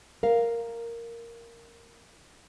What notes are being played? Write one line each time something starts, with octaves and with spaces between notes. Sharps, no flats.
A#4 F5